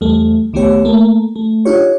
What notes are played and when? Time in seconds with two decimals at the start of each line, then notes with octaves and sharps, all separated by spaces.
0.01 E2 G3 A3
0.53 C#2 D#3 A3 B3 G4 C#5
0.85 A3 A#3
1.36 A3
1.65 D4 D#4 F4 G4 C#5